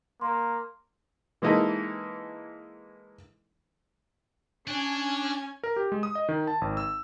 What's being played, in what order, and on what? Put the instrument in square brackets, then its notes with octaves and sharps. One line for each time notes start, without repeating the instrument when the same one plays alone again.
[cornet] A#3 [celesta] C6
[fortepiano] E3 G#3 A#3 D#4 E4 A4
[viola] C#4 G#5 [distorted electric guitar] D4
[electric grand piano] A#4
G4
G#3
D#6
D#5
D#3
A5
G#1
E6